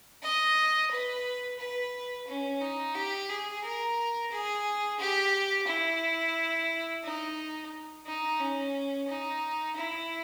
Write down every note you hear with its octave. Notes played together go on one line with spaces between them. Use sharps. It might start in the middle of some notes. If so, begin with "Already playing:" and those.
D#5
B4
B4
C#4
D#4
G4
G#4
A#4
G#4
G4
E4
D#4
D#4
C#4
D#4
E4